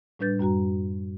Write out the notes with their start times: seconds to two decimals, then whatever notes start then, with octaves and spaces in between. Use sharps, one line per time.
0.19 A2 G3 D4 B4 G6 A6
0.39 F#2 G3 F#4 A#5